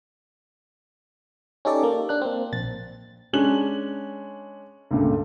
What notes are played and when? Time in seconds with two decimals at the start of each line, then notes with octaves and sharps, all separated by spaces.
1.65 C#4 D#4 G4 A4 D5
1.83 A#3
2.09 D4 F#6
2.22 A#3 C4
2.53 A#1 A6
3.33 G#3 C#4 D4 F#6 F#7
4.91 C#2 G2 A#2 A3